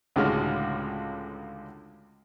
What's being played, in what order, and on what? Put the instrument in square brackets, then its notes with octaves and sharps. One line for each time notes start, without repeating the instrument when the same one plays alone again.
[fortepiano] C#2 A2 D3 G#3 F#4 F6